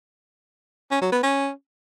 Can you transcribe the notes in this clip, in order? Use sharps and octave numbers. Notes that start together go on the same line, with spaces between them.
C#4
F#3
B3
C#4